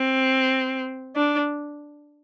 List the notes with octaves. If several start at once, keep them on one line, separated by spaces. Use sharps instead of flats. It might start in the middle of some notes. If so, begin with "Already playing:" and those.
Already playing: C4
D4